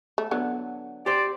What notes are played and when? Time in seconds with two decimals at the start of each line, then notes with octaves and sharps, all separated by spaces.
0.18 A3
0.31 D3 F#3 B3
1.06 G4 C5 D5